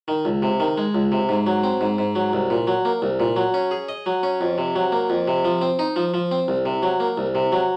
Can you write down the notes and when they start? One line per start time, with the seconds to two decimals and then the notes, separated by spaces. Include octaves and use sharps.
0.08 D#3
0.25 C#2
0.42 C3
0.60 D#3
0.78 G#3
0.95 C#2
1.12 C3
1.29 G#2
1.46 F#3
1.64 C4
1.81 G#2
1.98 G#2
2.15 F#3
2.33 C2
2.50 A#2
2.67 F#3
2.85 A#3
3.02 C2
3.20 A#2
3.36 F#3
3.54 C#4
3.71 G#4
3.89 D#5
4.06 F#3
4.23 C#4
4.41 F2
4.58 C3
4.75 F#3
4.92 A#3
5.10 F2
5.28 C3
5.45 F3
5.62 C4
5.79 D#4
5.96 F3
6.14 F3
6.31 C4
6.48 C2
6.66 C3
6.83 F#3
7.00 A#3
7.18 C2
7.35 C3
7.52 F#3